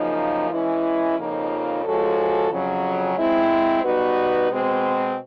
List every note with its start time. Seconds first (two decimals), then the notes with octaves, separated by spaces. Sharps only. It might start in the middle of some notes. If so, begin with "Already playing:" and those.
Already playing: F#2 C#3 F3 A#3 D#4
0.51 E3 G#3 C#4 E4
1.18 F2 C#3 F3 A#3 D#4
1.84 F3 G#3 C#4 F#4 A4
2.50 F2 C#3 F#3
3.16 G#3 C4 E4
3.83 G3 B3 D#4 F#4 B4
4.50 B2 G#3 C4